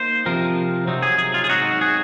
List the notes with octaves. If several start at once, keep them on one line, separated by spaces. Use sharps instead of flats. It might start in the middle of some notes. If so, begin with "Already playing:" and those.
Already playing: A#3 D#4 C5
C3 F3 C4 A#4
C3 F#3 C4 D#4
G#4
G#4
F4
G#4
G#2 F#3 C4 D#4 F#4
G#4